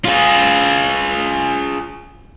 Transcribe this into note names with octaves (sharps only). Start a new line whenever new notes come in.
F4 G#4